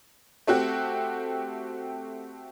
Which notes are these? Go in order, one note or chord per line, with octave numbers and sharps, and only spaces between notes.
A3 C4 F#4 G4